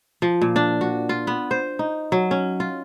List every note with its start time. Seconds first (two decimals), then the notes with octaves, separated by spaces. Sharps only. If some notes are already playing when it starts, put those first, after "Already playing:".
0.22 F3
0.42 A#2
0.56 D4
0.81 F#4
1.09 F4
1.27 B3
1.51 C5
1.79 D#4
2.12 F#3
2.31 C#4
2.60 F4